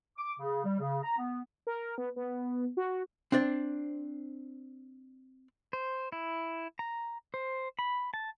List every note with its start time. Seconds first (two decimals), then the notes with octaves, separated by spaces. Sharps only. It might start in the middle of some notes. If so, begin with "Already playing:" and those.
0.18 D6
0.40 C#3
0.64 G3
0.79 C#3
1.03 A#5
1.18 B3
1.67 A#4
1.98 B3
2.16 B3
2.77 F#4
3.32 C4 D4 C5 D5
5.73 C5
6.12 E4
6.79 A#5
7.34 C5
7.79 B5
8.14 A5